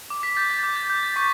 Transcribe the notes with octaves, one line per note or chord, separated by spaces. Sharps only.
D6
B6
G6 A6
A6
D6 G6
A6
G6
A6
C#6 B6